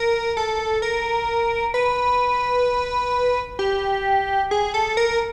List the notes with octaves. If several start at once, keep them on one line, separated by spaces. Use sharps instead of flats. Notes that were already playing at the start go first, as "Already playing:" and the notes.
Already playing: A#4
A4
A#4
B4
G4
G#4
A4
A#4